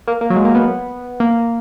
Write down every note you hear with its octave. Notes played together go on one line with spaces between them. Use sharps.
A#3
A#3
F#3
G#3
A#3
B3
A#3